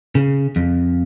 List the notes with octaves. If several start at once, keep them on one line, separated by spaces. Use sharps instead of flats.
C#3
F2